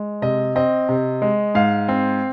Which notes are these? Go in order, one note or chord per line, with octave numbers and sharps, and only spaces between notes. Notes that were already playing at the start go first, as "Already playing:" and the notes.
Already playing: G#3
C3 D#5
C4 D#5
C3
G#3
G#2 F5
C4